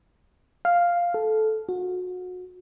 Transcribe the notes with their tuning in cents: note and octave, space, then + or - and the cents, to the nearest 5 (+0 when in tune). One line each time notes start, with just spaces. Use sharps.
F5 +0
A4 -15
F#4 -30